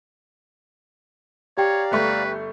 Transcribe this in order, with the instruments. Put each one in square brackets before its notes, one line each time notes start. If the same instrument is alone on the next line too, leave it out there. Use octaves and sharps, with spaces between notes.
[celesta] G4 G5 [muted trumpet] C#5 [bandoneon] D5 F5 A#5
[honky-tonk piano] G1 A3 C#6 [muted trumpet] B4